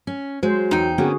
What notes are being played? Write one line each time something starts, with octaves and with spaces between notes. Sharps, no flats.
C#4
F#3 G#3 C5
E2 D#4 G5
D3 A#3 B3 C#4 F#4 G#4